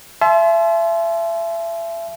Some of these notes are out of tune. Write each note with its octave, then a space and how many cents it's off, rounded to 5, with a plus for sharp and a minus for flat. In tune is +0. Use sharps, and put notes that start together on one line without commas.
E5 +30 A5 -45 C6 +0